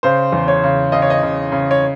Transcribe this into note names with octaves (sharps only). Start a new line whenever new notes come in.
C#3 C5
E2
C#5
C#3
C#3 D#5
C#5
D#5
C#3
C#3
C#5